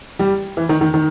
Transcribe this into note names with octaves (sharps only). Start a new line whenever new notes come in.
G3
E3
D#3
D#3
D#3